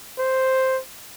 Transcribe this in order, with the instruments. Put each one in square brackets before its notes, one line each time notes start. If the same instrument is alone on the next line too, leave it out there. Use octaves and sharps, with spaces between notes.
[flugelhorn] C5